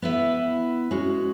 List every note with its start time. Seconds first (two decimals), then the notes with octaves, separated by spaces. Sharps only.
0.02 B3 E4 B4 E5
0.91 G#3 C#4 F#4